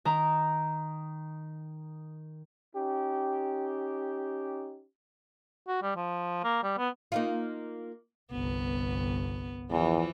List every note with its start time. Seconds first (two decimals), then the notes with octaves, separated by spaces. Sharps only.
0.05 D#3 A#5
2.76 C#4 D#4 G4
5.68 F#4
5.83 G3
5.96 F3
6.44 A#3
6.63 G3
6.78 B3
7.12 A#3 D#4 F4
8.32 G1 C2 B3
9.71 E2 E3 F3